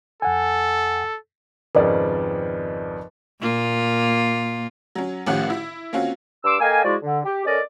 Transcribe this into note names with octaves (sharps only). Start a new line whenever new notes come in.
F2 A4 F#5 G#5
G#1 F2 C#3 A#4 B4 D5 D#5
A#2 A#3 F4
F#3 C#4
G#1 A2 F3 C#4 G4 F#5
E4
A#3 C4 C#4 F4 F#4
G2 C6 D6 E6
A#3 A4 D#5 F5 G5 G#5
F3 G#3 E4 F#4 G#4 D5
D3
G4
C#4 A4 A#4 D5 D#5